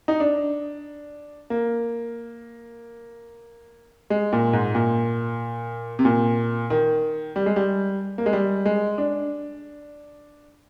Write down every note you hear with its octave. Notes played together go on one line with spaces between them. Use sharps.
D#4
D4
A#3
G#3
A#2
G#2
A#2
C3
A#2
D#3
G3
G#3
G3
A#3
G#3
G3
G#3
D4